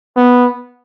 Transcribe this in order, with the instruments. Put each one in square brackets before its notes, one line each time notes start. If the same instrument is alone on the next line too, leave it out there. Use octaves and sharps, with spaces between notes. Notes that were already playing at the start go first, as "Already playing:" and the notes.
[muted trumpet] B3